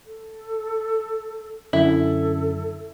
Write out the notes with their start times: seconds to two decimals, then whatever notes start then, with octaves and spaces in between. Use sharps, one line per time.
0.06 A4
1.73 F#2 D3 E4 A4